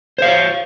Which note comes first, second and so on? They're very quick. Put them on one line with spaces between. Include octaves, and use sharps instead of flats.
C5 F5 C#5